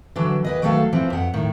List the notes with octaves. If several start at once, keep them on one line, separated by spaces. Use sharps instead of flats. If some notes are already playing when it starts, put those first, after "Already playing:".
D3 E3 F#3
D#2 B4 D#5
D#3 F#3 A3 A4 F5
E3 F3 C4
F2 F#5
A2 D#3